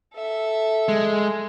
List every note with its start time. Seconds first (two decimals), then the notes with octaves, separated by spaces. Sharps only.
0.14 A4 E5
0.88 G#3